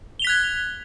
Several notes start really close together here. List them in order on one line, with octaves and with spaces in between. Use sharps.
G7 F7 B6 F#6 G#6